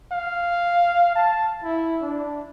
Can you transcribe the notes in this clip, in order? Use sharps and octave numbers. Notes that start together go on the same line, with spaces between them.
F5
A5
E4
D4